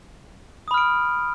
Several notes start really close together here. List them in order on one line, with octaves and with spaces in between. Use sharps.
D#6 B5 F6 D7